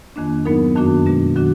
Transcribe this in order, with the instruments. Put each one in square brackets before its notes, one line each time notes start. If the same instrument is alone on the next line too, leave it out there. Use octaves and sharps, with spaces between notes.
[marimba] F2 D#3 A#3 D4
G#2 F#3 B3 D#4 A#4
F#2 D#3 A#3 D4 F#4
B2 G#3 D4
D#3 F#3 D4 F#4